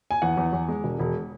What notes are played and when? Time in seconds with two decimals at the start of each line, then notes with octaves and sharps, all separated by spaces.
0.11 G#5
0.22 E2 F#5
0.37 E2
0.53 E2
0.68 G#3
0.84 E1
0.99 E1